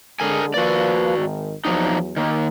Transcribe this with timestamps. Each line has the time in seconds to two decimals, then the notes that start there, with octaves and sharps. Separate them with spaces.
0.20 D3 G#3 G#4 A#4 G#5
0.54 F3 A#3 F#4 B4 D5
1.16 G#1 D#3
1.65 E2 F3 F#3 D4 D#4
2.17 D#3 A#3